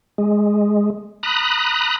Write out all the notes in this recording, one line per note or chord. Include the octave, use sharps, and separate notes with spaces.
G#3
A#5 B5 D#6 F#6